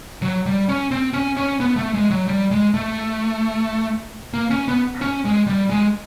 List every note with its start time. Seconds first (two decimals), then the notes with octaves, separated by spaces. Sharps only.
0.22 F#3
0.46 G3
0.69 C#4
0.91 C4
1.13 C#4
1.37 C#4
1.60 B3
1.76 A3
1.94 G#3
2.11 F#3
2.27 G3
2.51 G#3
2.74 A3
4.33 A#3
4.50 C#4
4.68 B3
5.01 C#4
5.25 G#3
5.47 G3
5.70 G#3